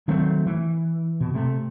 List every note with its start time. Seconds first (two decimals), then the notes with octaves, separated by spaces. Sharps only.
0.08 D#3 F#3 A3 C4
0.46 E3
1.21 B2
1.34 C3 A3